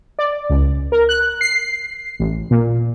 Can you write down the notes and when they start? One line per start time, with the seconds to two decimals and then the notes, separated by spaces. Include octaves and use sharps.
0.19 D5
0.50 C#2
0.92 A#4
1.09 F#6
1.41 C7
2.19 A1
2.51 A#2